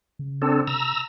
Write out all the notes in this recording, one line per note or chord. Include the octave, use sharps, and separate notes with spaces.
C#3
C4 D4 A4
C3 A#5 E6